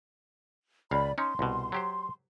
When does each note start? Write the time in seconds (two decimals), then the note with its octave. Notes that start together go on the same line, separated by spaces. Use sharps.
0.91 C#2 D5 F5 B5
1.18 C#4 D#4 C6
1.39 C2 B2
1.72 F#3 G4 C5